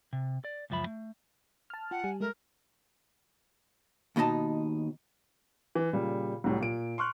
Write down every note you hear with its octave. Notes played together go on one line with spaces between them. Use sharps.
C3
D5
C#2 F#2 F3 E5 B5
A3
A5 F6
F4 F#5 G5
G3 G#5
G#3 A4 A#4 E5
D#2 B2 D#4 D#5 A5
E3
A#2 C#3 G3
C2 A2 F#3
A#2 D7
C6 C#6 F6 F#6